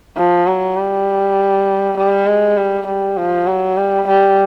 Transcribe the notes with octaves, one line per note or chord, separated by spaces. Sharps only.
F3
F#3
G3
G3
G#3
G3
G3
F3
F#3
G3
G3